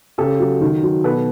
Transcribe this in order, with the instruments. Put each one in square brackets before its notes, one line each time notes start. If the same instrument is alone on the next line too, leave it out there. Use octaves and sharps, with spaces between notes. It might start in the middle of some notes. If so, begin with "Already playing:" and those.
[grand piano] C#3 G4 A4
F#3
D#3
F#3
B2 A4 B4